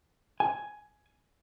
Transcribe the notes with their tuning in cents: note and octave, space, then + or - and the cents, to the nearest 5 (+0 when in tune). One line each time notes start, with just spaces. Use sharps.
G#5 +10